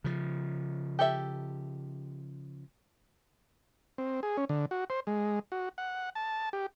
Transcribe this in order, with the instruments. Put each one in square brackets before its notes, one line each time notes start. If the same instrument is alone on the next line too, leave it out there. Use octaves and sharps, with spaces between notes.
[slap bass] C#3 F3
[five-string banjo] G4 A4 E5
[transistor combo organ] C4
G#4
C#4
D3
F#4
C5
G#3
F#4
F#5
A5
G4